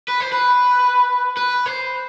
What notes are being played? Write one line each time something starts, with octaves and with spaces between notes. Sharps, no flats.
B4
C5
B4
B4
C5